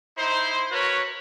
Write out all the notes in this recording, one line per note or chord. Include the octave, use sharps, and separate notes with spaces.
D#4 E4 C5
F#4 A#4 B4 C#5